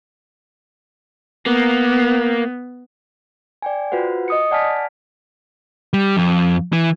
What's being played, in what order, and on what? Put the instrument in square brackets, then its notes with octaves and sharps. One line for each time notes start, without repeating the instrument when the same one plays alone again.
[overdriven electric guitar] A#3 [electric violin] B3
[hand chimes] D5 G5 G#5
F4 F#4 B4 C5 F#5
D#5 D#6 C#7
D5 F#5 G#5 A5 F6 B6
[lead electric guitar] G3
F2
E3